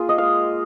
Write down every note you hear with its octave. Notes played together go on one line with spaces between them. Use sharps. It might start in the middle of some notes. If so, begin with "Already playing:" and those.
Already playing: A#3 F4 G#4
D#5
G#3 F5